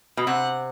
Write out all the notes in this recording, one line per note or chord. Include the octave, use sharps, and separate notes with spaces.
B2
C3 F#5